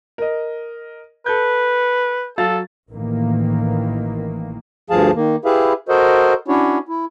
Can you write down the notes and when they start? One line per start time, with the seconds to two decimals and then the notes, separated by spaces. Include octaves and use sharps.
0.18 A#4 D#5
1.26 A4 B4 G6
2.38 F#3 A4 F5 A6
2.89 A1 D#3 E3 A#3
4.90 D2 G2 F3 G#4 F5 A5
5.15 D#3 A#3
5.45 E4 G4 G#4 B4 E5 F5
5.89 F#4 A4 A#4 C5 D#5
6.48 C#4 D4 E4 F#4 C#5
6.89 E4